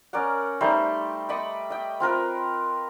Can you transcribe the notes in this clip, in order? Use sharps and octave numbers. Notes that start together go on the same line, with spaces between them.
C#4 A#4 D5 F#5
G3 A3 D#4 C5
D5 D#5 B5 C#6
D#5 G5
C4 F4 A#4 B4